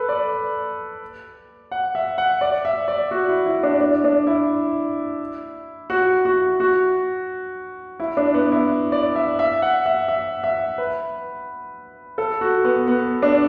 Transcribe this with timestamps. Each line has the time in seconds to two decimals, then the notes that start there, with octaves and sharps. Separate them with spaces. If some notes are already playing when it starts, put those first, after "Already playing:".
Already playing: A4 B4
0.09 D5
1.72 F#5
1.95 E5
2.18 F#5
2.41 D5
2.65 E5
2.88 D5
3.11 F#4
3.28 E4
3.46 E4
3.63 D4
3.81 D4
4.04 D4
4.27 E4
5.90 F#4
6.25 F#4
6.60 F#4
8.00 E4
8.17 D4
8.34 B3
8.52 E4
8.92 D5
9.16 E5
9.39 E5
9.62 F#5
9.86 E5
10.08 E5
10.44 E5
10.78 B4
12.18 A4
12.41 F#4
12.64 B3
12.88 B3
13.23 D4